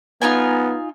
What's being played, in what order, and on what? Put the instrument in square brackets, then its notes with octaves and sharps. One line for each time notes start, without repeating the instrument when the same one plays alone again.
[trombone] B3 [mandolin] D#4 F4 G#5